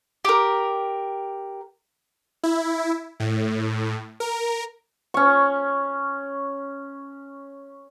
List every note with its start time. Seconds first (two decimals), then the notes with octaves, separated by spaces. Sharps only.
0.25 G4 A#4
2.44 E4
3.20 A2
4.20 A#4
5.14 C#4 C#6